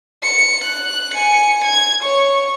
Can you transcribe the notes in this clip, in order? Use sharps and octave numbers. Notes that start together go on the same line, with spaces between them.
C#7
F#6
G#5 C#7
G#6
C#5 C#6